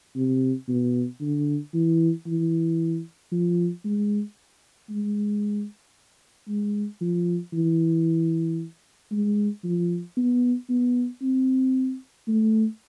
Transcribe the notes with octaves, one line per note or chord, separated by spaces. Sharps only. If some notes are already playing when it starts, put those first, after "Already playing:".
C3
B2
D3
E3
E3
F3
G#3
G#3
G#3
F3
E3
G#3
F3
B3
B3
C4
A3